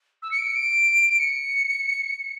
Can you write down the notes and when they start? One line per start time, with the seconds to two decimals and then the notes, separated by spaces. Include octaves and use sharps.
0.23 E6
0.31 C#7
0.38 D7
0.47 C#7
0.56 D7
1.09 D7
1.20 C#7